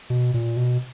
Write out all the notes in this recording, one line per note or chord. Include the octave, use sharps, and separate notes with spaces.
B2
A#2
B2